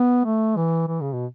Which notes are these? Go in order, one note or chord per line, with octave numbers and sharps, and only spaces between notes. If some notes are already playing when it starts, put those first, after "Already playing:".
Already playing: B3
A3
E3
E3
C#3
B2